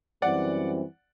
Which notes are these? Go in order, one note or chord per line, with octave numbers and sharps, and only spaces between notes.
F#2 E3 G3 C4 D5 F#5